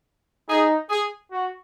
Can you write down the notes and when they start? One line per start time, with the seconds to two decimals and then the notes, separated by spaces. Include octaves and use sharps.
0.49 D#4 G#4
0.90 G#4
1.32 F#4